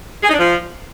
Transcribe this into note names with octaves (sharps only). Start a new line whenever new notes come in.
G#4
D#4
D4
F3